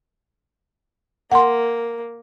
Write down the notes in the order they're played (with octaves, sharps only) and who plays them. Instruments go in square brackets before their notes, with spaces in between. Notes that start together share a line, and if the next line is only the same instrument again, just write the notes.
[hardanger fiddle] A#3 [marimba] F#5 C6